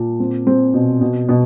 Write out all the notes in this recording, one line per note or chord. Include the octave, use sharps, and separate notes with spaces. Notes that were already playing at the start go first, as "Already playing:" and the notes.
Already playing: A#2 A5
C4
C4
B2
B2
B2